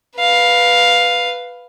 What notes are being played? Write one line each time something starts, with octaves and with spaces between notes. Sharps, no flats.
B4 F5